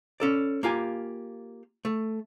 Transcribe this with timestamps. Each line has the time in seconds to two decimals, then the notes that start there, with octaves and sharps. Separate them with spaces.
0.20 C#4 A4 D5
0.63 A#3 F4 G4 G#5
1.85 A3